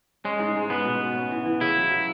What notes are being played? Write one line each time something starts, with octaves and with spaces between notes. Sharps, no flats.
G#3 C#4
G#2
G#2
B3 B4
B2
B4
C#4
E3
E3
C#3 E4
F#3
F#3